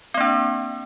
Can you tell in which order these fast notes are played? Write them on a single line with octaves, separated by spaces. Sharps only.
C4 A#3 D4